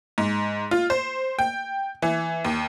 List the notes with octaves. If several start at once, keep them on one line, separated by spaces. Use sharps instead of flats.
G#2
F4
C5
G5
E3
D#2